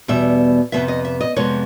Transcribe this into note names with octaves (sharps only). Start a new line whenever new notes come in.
E2 B2 G3 E5
F2 C3 F3 G#3 B3 E5
D#5
E5
D#5
F2 C3 F3 G#3 B3 C#5